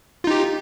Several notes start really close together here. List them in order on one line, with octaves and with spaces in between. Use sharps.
F4 D#4 G4